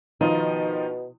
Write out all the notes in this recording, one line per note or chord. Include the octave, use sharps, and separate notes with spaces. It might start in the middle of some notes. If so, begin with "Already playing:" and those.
B2 D#3 F3 D#4 F4